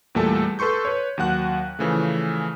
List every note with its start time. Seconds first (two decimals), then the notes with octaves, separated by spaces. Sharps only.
0.15 E2 A#2 G3 A3 A4 A5
0.59 A4 B4 C6 C#6 G6
0.85 B4 C#5
1.18 D#2 F#3 F#5 F#6
1.79 C#3 E3 F3 A3